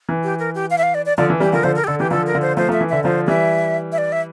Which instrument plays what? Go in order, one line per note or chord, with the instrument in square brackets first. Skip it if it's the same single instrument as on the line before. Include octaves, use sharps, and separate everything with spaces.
[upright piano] E3
[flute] G4
A#4
G4
F5
E5
F5
D5
D5
[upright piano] D3 F3 [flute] D5
[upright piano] E3
[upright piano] E3 G3 [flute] G4
[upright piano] D3 F3 [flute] A#4
[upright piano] D3 F3 [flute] C5
[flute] A#4
G4
[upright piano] D3 [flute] A4
[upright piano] E3 [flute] G4
[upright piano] D3 F3 [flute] A4
[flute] A#4
[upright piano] D3 F3
[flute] C5
[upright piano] F3 A3 [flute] C5
[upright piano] F3 A3 [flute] E5
[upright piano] E3
[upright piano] D3 [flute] E5
[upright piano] D3 F3 [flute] C5
[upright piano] E3 G3 [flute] E5
[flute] E5
D5
E5